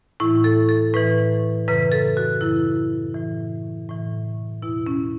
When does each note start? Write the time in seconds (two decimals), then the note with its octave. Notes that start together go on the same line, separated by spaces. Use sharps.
0.20 A2 E3 E4
0.44 A4
0.69 A4
0.94 A2 E3 B4
1.68 F#2 C#3 E3 B4
1.92 A4
2.17 F#4
2.41 F#2 C#3 E3 E4
3.15 A2 E3
3.89 A2 E3
4.62 E2 B2 E4
4.87 C#4